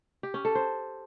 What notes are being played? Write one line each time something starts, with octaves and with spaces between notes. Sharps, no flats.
G4
C#4
A4
C5